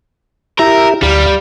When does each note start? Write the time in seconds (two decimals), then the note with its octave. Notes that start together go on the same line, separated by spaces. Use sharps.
0.59 E4 G4 A#4 E5
1.02 D2 G3 F5